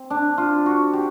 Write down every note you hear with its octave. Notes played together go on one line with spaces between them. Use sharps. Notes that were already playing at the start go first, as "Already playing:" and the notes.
Already playing: C4
D4
F4
F#4
G4